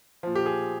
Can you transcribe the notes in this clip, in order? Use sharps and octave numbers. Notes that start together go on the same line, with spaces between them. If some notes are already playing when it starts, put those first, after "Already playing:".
A#2 F3
G4
G#4